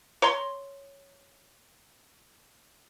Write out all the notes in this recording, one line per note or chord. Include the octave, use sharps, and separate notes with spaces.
C#5 A#5 C6